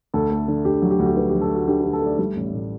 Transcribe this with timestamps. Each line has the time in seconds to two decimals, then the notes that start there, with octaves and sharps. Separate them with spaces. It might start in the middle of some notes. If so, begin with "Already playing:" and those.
0.14 D2 A4
0.31 A3
0.48 D3
0.65 D2 G4
0.82 F#3
0.91 G4
0.99 D2 F#4
1.06 G4
1.16 D3 B4
1.29 F#3 G4
1.41 A4
1.50 A3 F#4
1.68 D3 G4
1.81 D3 G4
1.93 A4
2.02 A3 D5
2.19 G3
2.36 A1
2.53 A2